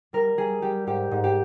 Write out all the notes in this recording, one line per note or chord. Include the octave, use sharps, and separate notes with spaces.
G3 A#4
G3 G#4
G3 G4
G#2 G4
G#2
G4